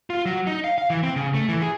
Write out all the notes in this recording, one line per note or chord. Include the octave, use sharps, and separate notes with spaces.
F4
F#3
D#4
F5
F5
E3
C4
C#3
A3
E3
G#4